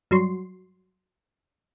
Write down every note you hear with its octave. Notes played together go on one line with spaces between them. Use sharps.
G2 F#3 C6